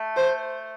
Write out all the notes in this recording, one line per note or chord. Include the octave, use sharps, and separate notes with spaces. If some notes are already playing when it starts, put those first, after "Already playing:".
Already playing: A3
C5